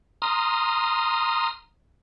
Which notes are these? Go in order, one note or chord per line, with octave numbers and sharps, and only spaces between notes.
A#5 C6 D#6 F6